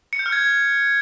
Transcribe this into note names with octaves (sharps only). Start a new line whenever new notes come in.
C#7
G6
F6
G#6